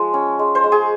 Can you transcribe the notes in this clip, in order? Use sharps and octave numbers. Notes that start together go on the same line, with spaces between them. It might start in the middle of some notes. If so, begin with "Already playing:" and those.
Already playing: F3 G#3
C#4
G#3
C5
G#3
G#4